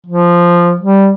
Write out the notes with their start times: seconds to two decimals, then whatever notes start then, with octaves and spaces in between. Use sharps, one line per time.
0.07 F3
0.80 G3